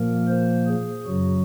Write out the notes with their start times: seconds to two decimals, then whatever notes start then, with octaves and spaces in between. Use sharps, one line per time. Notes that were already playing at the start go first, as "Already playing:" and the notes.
Already playing: A#2 F3 A#3 A#4
0.28 C5
0.67 G#4
1.06 F#2 C#3 F#3 F#4